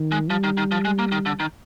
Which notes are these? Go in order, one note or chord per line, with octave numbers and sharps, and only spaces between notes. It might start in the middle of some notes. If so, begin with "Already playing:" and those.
Already playing: D#3
G#3
F3 G3
D#3
D#3
F3
G#3
A#3
D#3
D3
D#3